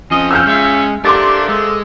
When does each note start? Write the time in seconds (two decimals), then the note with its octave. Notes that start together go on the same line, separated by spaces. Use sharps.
0.11 F3 C4 C#4 D#5
0.31 C#3 E6 F6 G6
0.47 G#3 F4 C#5 E5
1.05 C3 A3 A#3 D4 G4 C6 D6 A6
1.49 G#3 A4